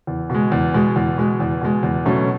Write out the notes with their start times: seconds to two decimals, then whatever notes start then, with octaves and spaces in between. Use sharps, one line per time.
0.07 E2
0.30 B2 G#3
0.52 E2
0.74 B2 G#3
0.96 E2
1.18 B2 G#3
1.40 E2
1.61 B2 G#3
1.83 E2
2.06 B2 F#3 A3 C#4